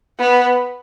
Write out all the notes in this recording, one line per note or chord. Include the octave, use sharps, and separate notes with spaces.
B3